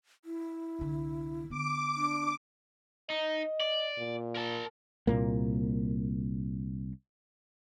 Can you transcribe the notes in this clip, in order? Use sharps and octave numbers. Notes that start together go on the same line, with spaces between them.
E4
C2 D3
D3 B3 D6
D4
D#4 D#5
D5
A#2
A#4 A5
C2 A#2 A#3